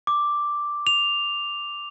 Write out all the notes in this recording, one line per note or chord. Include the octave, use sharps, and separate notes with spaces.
D6
F7